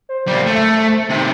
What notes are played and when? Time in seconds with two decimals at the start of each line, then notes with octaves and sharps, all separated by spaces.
0.09 C5
0.27 G3 A#3
0.46 A3
1.09 C3 D#3